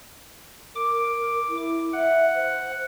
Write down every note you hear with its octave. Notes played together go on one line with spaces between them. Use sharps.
A#4 D6
E4
E5 F#5
C5